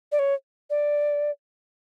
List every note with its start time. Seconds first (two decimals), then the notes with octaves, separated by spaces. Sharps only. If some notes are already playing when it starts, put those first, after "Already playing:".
0.12 D5
0.19 C#5
0.70 D5